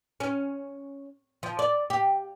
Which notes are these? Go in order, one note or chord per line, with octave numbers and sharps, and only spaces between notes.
C#4
F3
D5
G4